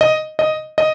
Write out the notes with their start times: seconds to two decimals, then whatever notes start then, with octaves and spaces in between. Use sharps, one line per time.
0.01 D#5
0.39 D#5
0.78 D#5